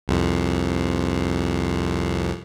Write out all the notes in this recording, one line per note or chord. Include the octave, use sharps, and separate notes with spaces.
C2 F2